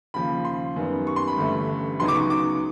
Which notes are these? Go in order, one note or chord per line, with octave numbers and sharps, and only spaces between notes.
D#2 C#3 F3 B5
C6
F#2 D#3 G3 B3
C#6
C6
B5
G1 G2 E3 A3 C#4
C#2 C#3 F#3 B3 D#4 C6
D6
C#6
D6